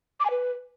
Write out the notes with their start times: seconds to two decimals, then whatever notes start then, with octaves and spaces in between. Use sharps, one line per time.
0.20 D6
0.25 G#5
0.31 B4